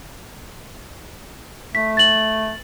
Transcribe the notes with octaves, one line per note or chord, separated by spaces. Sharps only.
A3 B6
A6 F#7